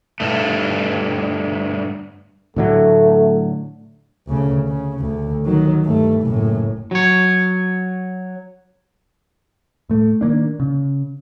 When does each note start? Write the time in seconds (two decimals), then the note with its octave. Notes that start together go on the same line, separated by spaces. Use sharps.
0.20 G2 A3
2.56 A2 D3 F#3 A3
4.27 D2 C#3
4.67 C#3
4.99 D2
5.45 D#3 F#3
5.84 G2 A3
6.21 F#1 A2
6.91 F#3 C#5
9.90 A2 A3
10.21 D#3 A#3 D4
10.60 C#3